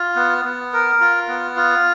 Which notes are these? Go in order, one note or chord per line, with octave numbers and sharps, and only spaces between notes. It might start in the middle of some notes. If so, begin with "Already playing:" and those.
Already playing: F4
B3
B3
A#4
F4
B3
F4